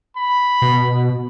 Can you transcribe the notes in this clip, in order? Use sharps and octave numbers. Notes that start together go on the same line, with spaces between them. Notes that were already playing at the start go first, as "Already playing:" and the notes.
B5
B2